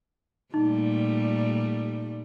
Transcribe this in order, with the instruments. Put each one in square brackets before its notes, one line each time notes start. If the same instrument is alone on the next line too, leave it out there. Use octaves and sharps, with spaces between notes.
[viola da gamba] A#2 G3 A3 [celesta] D#4